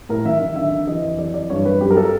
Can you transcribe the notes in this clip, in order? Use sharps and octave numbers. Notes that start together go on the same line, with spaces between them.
A2 A#4
D#3 E5
D#3 E5
D3 E5
D3
E3 D#5
F2
E3 D5
E3 D5
G2 C#5
G2 B4
F#2 G4
A#4
A4